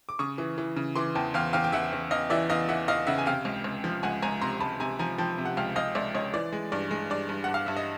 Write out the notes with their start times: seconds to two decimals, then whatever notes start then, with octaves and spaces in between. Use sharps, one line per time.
0.09 D6
0.19 C#3 C#6 D#6
0.38 E3
0.58 E3
0.76 C#3
0.96 E3 C6 D6
1.15 E2 G5 A5
1.34 E2 F5 G5
1.53 E2 F5 G5
1.64 G5
1.72 E2 E5 F#5
1.93 E2
2.11 E2 D#5 F5
2.30 E3 D5 E5
2.49 E2 D#5 F5
2.69 E3 E5 F#5
2.88 E2 D#5 F5
3.07 C#3 E5 F#5
3.18 G#5
3.26 C3 F5 G5
3.45 C#2
3.64 C#2
3.84 F3
4.03 C#2 F#5 G#5
4.22 C#2 G#5 A#5
4.41 C3 A#5 C6
4.60 C#2 A5 B5
4.80 C3 G#5 A#5
4.99 F3 G#5 A#5
5.18 F3 G5 A5
5.38 C3
5.45 F#5
5.57 C#2 F5 G5
5.76 C#2 D#5 F5
5.95 C#2 D5 E5
6.15 C#2 C#5 D#5
6.34 E3 D5
6.52 G#3
6.72 G2 D5
6.91 G#3
7.10 G2 D5
7.29 G2
7.44 G2 F#5
7.54 F5
7.66 G2 E5
7.77 D#5